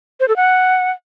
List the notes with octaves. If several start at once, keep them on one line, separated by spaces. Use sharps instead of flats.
C5
A4
F#5